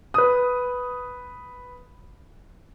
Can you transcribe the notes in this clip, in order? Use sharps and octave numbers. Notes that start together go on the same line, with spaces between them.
B4 D#6